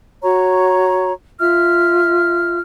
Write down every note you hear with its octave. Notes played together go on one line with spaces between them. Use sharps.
F#4 C#5 A#5 C#6
F4 E5 F6